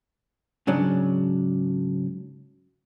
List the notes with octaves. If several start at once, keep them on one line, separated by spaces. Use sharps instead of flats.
G#2 C#3 F#3 D4